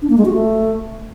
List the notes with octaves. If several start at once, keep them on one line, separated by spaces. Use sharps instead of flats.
D4
A#3
G#3
F#4
A3